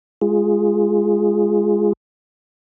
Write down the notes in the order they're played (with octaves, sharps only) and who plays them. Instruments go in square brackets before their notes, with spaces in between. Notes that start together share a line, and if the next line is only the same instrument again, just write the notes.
[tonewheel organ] G#3 F4 G#4